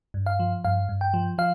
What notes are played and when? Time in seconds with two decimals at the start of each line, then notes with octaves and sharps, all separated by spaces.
0.14 G2
0.26 F5
0.40 F3
0.64 G2 F5
0.89 G2
1.01 G5
1.14 F3
1.38 F3 F5